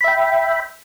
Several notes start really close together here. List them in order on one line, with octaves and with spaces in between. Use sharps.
B5 E5 G5